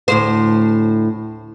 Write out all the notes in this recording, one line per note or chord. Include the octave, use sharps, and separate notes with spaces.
D2 A2 C5